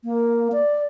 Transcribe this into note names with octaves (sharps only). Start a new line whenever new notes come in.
A#3
D5